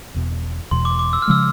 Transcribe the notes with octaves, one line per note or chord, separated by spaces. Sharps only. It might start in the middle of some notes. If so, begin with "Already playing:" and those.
E1 E2 B2
E1 E2 B2 C6
D6
D6
E6
F6
C#3 F3 G#3 E6